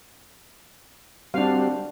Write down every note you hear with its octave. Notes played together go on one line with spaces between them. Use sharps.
G3 C4 D4 F#4 F5